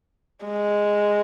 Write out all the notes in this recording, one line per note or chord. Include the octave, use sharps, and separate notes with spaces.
G#3